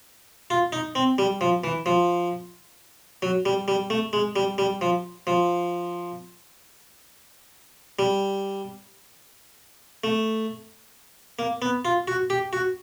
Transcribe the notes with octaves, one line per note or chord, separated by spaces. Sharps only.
F4
D#4
C4
G3
F3
E3
F3
F#3
G3
G3
A3
G#3
G3
G3
F3
F3
G3
A3
A#3
B3
F4
F#4
G4
F#4